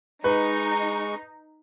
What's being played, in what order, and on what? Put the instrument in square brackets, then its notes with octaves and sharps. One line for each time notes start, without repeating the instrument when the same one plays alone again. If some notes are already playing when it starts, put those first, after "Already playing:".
[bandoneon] G#3 C#6 [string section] D#4 [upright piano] B4